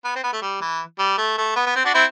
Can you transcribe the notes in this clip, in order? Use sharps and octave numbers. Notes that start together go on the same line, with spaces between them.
B3
C4
B3
A3
G3
E3
G3
A3
A3
B3
B3
C4
D4 F#4
C4 E4